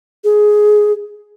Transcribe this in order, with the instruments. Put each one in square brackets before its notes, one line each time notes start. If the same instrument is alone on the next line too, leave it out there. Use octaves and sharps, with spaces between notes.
[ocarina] G#4